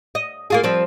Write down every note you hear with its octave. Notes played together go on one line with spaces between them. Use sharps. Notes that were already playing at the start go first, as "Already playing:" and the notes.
D#5
A#3 F4 G#4
F3 G3 C4